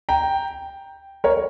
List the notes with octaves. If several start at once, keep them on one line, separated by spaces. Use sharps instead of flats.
G5 A#5
A#4 C#5